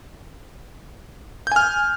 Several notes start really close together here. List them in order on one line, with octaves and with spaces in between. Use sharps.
G6 G#5 F6